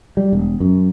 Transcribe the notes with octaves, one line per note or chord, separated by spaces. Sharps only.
G3
E1
F#2